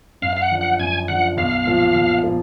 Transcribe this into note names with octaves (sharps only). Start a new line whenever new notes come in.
F#2 F5
F5
F#5
D3 F3
F#5
F#2 G#5
D3 F3 F#5
B1 F5
A#2 F3 A#3 F4
B1
A#2 F3 A#3 F4